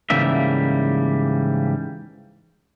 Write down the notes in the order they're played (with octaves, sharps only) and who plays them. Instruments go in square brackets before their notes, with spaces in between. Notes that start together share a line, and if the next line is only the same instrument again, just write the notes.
[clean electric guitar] G#2 C#3 E3 G3 A#3 E5